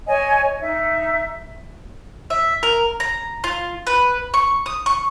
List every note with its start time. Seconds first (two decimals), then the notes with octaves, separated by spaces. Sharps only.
0.07 C#5 D#5 G#5
0.61 D#4 E5
2.30 E5
2.63 A#4
3.00 A#5
3.44 F4
3.87 B4
4.34 C#6
4.66 D#6
4.86 C#6